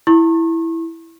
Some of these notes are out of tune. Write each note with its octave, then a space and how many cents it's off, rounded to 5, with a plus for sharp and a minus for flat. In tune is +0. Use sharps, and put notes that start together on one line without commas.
E4 +0 C#6 -40